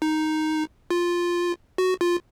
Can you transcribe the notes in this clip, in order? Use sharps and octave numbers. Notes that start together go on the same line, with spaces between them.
D#4
F4
F#4
F4